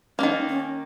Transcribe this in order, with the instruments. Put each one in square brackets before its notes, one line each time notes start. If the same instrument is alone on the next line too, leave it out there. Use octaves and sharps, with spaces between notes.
[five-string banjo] G3 A#3 [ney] C#4
[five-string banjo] D#3
[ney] C#4